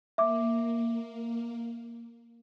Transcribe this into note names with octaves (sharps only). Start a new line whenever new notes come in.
A#3 E5 D6